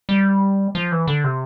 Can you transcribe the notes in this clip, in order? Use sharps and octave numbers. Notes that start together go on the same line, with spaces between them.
G3
F3
E3
D3
C3